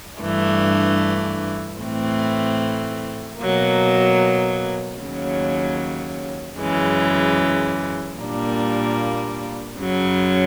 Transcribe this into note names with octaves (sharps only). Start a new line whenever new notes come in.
G2 E3 A3 D4
A2 E3 A3 C4
B2 F#3 A#3
D#2 C#3 F#3
F#2 C#3 E3 G#3
A#2 G3 A#3 D4
F#2 C#3 F#3